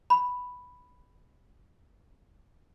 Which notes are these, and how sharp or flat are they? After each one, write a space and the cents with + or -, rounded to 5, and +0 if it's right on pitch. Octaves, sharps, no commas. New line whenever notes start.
B5 +0